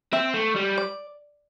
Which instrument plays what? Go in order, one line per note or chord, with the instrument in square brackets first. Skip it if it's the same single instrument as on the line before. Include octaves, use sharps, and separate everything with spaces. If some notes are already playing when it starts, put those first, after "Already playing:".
[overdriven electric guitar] C4 [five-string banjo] E5
[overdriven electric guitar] A3
G3
[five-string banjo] D5